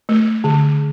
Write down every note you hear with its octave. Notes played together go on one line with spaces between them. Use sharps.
A3
D3